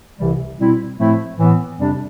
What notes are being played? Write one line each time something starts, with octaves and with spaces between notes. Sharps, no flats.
C2 C3 E3 G3
B2 G3 C4 E4
A2 F3 A3 C4 E4
A2 E3 B3
F2 C3 G3 D4